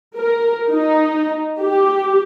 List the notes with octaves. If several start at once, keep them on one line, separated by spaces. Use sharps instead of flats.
A#4
D#4
G4